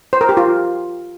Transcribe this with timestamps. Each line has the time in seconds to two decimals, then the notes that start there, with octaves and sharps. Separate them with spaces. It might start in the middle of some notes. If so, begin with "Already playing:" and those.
0.13 C5
0.21 A#4
0.29 G4
0.37 F4